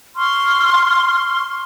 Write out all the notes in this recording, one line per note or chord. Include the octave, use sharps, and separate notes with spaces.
C6 C#6 F6